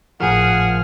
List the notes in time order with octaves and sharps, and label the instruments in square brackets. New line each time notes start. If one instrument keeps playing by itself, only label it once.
[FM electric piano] G#1 A2 A#4 [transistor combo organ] F3 F6 [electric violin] G#4 [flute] F#5